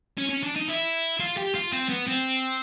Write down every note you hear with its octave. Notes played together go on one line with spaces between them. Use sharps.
C#4
C#4
D4
D#4
E4
F4
G4
F4
C4
B3
C4